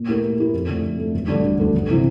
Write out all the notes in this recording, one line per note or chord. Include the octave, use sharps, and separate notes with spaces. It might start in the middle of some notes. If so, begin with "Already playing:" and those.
Already playing: A#2
A3 E4 G4 A#4
A#2
A3 E4 G4 A#4
F2
D3 A3
F2
D3 A3
E1
D2 D3 G3 D4
E1
D2 D3 G3 D4
G1
C3 E3